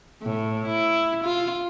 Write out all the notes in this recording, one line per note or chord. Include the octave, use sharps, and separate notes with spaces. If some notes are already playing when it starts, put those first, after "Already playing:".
A2
E4
F4